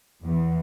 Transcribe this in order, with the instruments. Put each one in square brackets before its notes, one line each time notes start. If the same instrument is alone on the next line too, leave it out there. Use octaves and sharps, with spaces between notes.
[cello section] E2